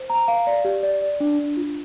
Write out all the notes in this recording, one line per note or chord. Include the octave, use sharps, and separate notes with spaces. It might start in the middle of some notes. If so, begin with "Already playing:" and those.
Already playing: C5
A#5
F5
D5
G4
D5
D5
D4
D4
F4